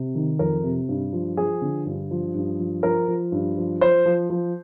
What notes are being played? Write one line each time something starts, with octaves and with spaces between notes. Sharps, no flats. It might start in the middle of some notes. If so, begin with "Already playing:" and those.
Already playing: C3
D#3
F2 A#4
C3
G2
F3
F3 G#4
D3
G2
F3
G2
F3
F3 A#4
F3
G2
F3
F3 C5
F3
F3